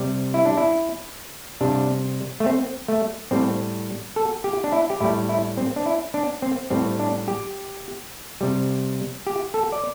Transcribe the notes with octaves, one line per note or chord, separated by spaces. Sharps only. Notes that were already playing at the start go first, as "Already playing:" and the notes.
Already playing: C3 G3
E4
D4
E4
C3 G3 D4
A3
C4
A3
A2 G3 C4
A4
G4
D4
E4
G4
A2 G3 E4
E4
C4
D4
E4
D4
C4
A2 G3 C4
D4
G4
C3 G3
G4
A4
D5